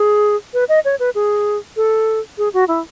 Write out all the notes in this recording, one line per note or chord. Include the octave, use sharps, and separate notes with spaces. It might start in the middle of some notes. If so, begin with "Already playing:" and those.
Already playing: G#4
B4
D#5
C#5
B4
G#4
A4
G#4
F#4
E4